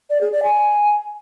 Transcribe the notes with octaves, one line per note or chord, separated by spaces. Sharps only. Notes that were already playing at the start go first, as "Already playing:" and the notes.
D5
G#4
D5
G#5